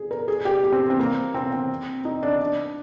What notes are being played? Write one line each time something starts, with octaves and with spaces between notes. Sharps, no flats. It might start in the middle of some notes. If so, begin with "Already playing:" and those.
Already playing: G#4
A#4
G#4
G4
G4
C4
C4
A#3
C4
C4
D#4
D4
D4